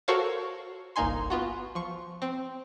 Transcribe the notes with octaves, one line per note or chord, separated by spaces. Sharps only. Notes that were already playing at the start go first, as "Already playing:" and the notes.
F#4 A4 A#4 C5 C#5 F5
G1 C2 A#3 D#4 G#5 C6
B3 F4 F#4
F3 C#6
C4